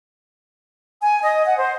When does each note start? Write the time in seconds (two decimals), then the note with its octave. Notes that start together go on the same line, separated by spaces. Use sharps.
1.02 G#5
1.22 D#5
1.46 F#5
1.58 C5